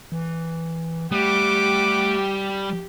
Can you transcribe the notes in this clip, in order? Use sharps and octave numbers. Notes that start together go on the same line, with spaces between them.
E3
G3 A3 G4 F#5 D6